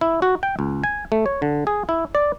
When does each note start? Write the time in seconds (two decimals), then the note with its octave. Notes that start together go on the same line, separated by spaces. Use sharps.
0.01 E4
0.22 F#4
0.43 G5
0.59 C#2
0.84 G#5
1.12 A3
1.26 C#5
1.42 D3
1.67 G#4
1.89 E4
2.15 D5